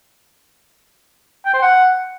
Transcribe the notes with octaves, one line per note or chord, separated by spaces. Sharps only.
G5
C5
F#5